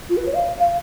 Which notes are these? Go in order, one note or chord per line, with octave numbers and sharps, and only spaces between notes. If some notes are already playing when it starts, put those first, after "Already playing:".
F4
B4
C#5
F5
F5